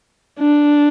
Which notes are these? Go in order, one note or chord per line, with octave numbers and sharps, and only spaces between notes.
D4